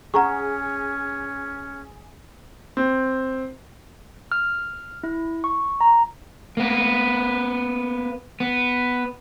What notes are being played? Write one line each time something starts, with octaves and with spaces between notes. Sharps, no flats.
C#4 G#4 F#5 A#5 C#6
C4
F6
E4
C#6
A#5
A#3 B3
B3